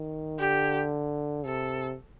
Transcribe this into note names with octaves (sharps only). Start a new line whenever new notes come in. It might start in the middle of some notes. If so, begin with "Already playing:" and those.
Already playing: D#3
D3 G4
C3 A4